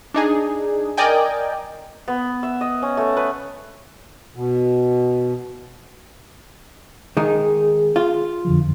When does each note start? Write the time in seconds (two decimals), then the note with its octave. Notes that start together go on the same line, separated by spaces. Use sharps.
0.14 D4 D#4 G#4
0.97 A#4 D5 D#5 G5 G#5
2.08 B3
2.43 E5
2.61 D#5
2.82 C#4
2.97 A3
3.17 B4
4.35 B2
7.17 D#3 G#3 D#4 G#4
7.96 F4
8.45 F2 D3 F3